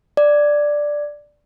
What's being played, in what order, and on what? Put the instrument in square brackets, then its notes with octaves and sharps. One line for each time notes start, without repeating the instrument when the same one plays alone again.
[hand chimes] D5